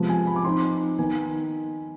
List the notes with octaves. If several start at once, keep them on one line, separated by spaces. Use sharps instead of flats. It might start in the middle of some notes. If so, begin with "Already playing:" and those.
Already playing: C3 F3 G#3 B3
G#5
B5
D6
F3 C4 D#4 C6
D#3 B3 D#4 G#5